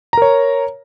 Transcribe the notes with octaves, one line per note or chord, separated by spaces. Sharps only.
A#4 C#5 A#5